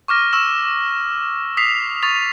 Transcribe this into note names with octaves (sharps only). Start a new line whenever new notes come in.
C#6 D6 F6 A#6
C#6 E6 E7
D#6 B6 C7 F7
C#6 D#6 A6 F7